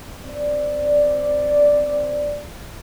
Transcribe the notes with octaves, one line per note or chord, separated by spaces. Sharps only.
C4 D5